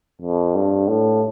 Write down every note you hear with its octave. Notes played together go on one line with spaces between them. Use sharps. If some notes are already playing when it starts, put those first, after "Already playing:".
F2
G2
A2